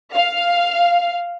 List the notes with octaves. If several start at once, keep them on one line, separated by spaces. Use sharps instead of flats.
F5